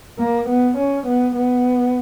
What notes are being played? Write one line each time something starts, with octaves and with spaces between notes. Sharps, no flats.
A#3
B3
C#4
B3
B3